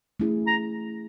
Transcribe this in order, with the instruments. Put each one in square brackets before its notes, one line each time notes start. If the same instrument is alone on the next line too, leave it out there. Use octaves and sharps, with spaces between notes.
[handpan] A3 C#4 E4 G#4
[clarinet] A#5